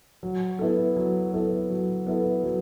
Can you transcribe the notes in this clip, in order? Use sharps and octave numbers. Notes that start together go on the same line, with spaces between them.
F#3
B3 E4 A4
F#3
B3 E4 A4
F#3
B3 E4 A4
F#3